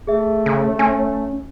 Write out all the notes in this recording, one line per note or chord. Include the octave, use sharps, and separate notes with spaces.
A3 G#4 E5
C#3
C#4 G#5